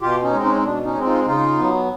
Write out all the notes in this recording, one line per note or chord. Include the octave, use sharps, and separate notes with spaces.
B2 F4 G4
C#4 D#4
G#3 C4
C#4 D#4
D#4
B2 D4
C#4 D#4
G#3 C4
D#4 F4
C#3 D#4 F4
F#3 B3